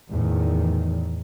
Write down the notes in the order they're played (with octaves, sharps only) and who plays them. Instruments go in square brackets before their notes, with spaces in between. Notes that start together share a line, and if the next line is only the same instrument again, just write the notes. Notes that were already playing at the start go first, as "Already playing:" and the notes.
[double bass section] E2 A2 D#3